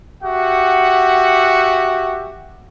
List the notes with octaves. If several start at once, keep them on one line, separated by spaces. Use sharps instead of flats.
F#4 G4 E5 F#5